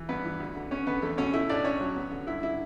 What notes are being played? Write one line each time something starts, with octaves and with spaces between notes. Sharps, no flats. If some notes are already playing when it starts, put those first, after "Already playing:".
Already playing: E3
G2 B3 B4
E3
D2
D3
B3 C#4 C#5
D3 B3 B4
E2 A3 A4
B2 C#4 C#5
A3 E4 E5
A2 D4 D5
C#4 C#5
F#3
B3
D3
G2 E4 E5
D3 E4 E5